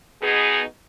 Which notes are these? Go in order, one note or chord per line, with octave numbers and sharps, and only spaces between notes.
B2 B3 D#4 G#4